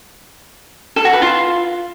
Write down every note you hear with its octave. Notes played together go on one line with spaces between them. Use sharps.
A4
F#4
B4
F4